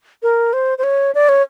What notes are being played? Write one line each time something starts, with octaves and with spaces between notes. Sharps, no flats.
A#4
C5
C5
C#5
D5
C#5